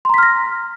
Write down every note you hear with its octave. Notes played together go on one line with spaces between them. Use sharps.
A#5 C6 F6 A#6 B6